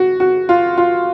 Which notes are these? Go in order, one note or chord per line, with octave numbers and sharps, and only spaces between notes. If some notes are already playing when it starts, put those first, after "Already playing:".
Already playing: F#4
F#4
F4
F4